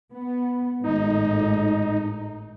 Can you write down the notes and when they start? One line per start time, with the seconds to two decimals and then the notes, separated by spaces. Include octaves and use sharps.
0.12 B3
0.84 G#1 A2 D#4